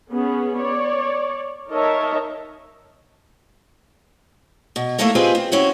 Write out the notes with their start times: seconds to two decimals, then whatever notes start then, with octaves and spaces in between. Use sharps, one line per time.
0.11 B3 C#4 G#4
0.58 C#5 D5
1.70 D#4 A#4 C#5 D#5 E5 A5
4.76 B2
4.98 A3 A#3 D#4 E4 A4 A#4
5.15 C4 F4 G4 G#4 B4 D#5
5.35 C4
5.52 C4 C#4 E4 F#4